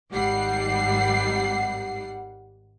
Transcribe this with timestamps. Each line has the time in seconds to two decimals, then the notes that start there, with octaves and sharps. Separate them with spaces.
0.12 G#1 G#2 G3 F#5 C7